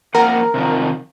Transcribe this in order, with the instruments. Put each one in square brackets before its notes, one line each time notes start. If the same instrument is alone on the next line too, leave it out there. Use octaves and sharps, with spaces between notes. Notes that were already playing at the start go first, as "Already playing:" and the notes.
[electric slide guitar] F3 A#3 F#5 [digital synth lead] A#4
[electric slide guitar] C3 D#3 F3